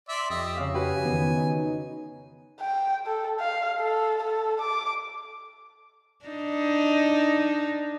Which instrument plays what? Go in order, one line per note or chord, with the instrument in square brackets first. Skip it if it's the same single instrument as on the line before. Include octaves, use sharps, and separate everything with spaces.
[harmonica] D5 E5 C6
[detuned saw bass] F2 [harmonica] G4 D#5 E5
[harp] C#3 F5
[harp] F#4 B4 [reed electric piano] G4 [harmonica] G#5
[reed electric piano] D#3 B3 [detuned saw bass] E3
[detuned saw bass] D#4
[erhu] G5
A4
F5
A4
A4
D6
[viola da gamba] D4 D#4